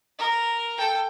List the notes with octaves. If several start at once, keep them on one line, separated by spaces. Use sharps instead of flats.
A#4
A4 G5